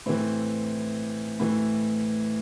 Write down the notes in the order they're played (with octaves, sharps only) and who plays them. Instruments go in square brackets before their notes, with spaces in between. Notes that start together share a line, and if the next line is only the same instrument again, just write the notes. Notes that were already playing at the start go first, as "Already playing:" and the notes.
[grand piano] A2 E3 C4
A2 E3